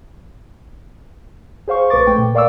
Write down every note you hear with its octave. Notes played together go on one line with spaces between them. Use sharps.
G#4 C5 F5 C#6
A#1 B4 C#6 D6 A6
A3 G5
A#2
A#4 D5 F5 C#6 D6 E6